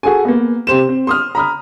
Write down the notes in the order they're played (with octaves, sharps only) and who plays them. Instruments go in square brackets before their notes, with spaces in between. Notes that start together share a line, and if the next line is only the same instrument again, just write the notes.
[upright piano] F#4 G#4 A4 G#5
A#3 B3
C3 G4 C5 E7
C4
C6 D#6 F6
A#5 B5 D#6 F6